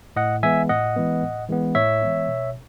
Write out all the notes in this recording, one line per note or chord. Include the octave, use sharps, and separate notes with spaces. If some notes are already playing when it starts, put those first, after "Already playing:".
A2 D#5 F#5
E3 G#3 B3 E5 G#5
A2 D#5 F#5
E3 G#3 B3
A2
E3 G#3 B3
A2 C#5 E5
E3 G#3 B3
B2